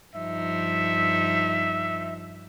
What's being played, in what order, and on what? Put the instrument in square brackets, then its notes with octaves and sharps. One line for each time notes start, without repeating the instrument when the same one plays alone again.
[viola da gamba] G2 F3 D#4 [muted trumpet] E5